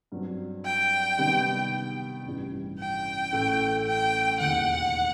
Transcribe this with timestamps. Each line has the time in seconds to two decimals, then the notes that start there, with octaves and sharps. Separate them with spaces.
0.12 G2 F#3 C4 F#4
0.65 G5
1.18 C3 D#3 G3 B3
2.25 A1 G2 E3 G3
2.79 G5
3.33 A1 A2 E3 A3
3.86 G5
4.39 E1 D#2 D#3 F#5